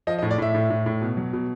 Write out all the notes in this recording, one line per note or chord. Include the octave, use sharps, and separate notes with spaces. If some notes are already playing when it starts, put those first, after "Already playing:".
F3 D#5
D#5
A2
D5
A2 E5
A2
A2
A2
B2
F#3
B2